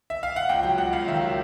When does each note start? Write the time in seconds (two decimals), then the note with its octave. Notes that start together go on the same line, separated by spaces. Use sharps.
0.10 E5
0.23 F5
0.36 F#5
0.49 C#2 G5
0.63 F#3 G5
0.78 C#2 F#5
0.93 C#2 F5
1.08 D#3 E5
1.21 F#3 F5